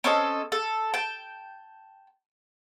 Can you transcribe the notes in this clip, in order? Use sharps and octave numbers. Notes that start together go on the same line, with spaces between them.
C4 C#4 A4 D#5
A4
G5 A5